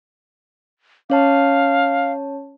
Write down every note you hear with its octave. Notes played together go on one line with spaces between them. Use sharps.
C#4 C#5 F5 A5